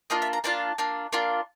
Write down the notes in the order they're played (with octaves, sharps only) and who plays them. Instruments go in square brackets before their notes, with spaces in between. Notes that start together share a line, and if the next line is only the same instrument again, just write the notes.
[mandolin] A#3 D4 F4 D#5
E5
A#5
A#3 D4 F4 A5
A#3 D4 F4
A#3 D4 F4